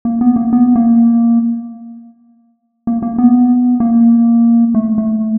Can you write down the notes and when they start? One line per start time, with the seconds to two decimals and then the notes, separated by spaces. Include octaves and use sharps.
0.05 A#3
0.21 B3
0.36 A#3
0.53 B3
0.76 A#3
2.87 A#3
3.02 A#3
3.18 B3
3.80 A#3
4.75 A3
4.98 A3